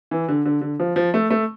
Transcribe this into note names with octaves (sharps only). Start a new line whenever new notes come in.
E3
D3
D3
D3
F3
F3
A3
A3